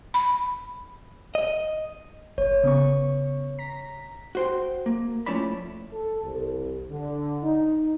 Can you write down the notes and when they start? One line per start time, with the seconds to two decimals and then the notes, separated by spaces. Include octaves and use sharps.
0.14 B5
1.35 D#5
2.38 G1 C#5
2.64 C#3 B3 C#6
3.59 A#5 B6
4.35 F#4 C5 G5
4.86 A#3
5.26 F3 A3 C#4 E4 D5 B5
5.93 A4
6.24 C2
6.90 D3
7.43 D#4